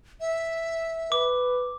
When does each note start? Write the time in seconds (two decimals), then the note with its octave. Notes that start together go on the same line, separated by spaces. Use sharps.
0.20 E5
1.12 B4 D6